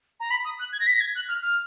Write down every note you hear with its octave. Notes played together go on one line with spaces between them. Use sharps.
A#5
B5
D#6
F#6
G#6
A#6
B6
A#6
G#6
F#6
F6
F6